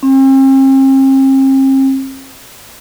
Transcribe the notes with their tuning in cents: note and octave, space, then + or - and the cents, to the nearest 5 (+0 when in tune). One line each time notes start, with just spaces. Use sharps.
C4 +45